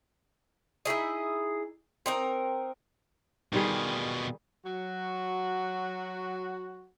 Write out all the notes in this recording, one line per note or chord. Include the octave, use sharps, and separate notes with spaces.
D#4 E4 G#4 D#5
C4 D#4 A#4
B2 D#3 G3 F4 G#4
F#3 F#4